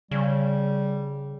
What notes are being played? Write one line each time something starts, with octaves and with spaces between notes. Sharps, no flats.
C#3 G3